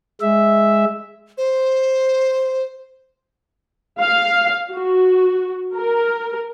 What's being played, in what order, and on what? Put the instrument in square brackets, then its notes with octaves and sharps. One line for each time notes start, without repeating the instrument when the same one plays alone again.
[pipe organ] G#3 E5
[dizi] C5
[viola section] F5
F#4
A#4